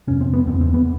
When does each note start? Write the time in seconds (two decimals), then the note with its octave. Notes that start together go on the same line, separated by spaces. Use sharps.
0.07 F2 C3 C#4
0.21 C4
0.33 B3
0.47 E2 C#3 C4
0.61 C4
0.74 B3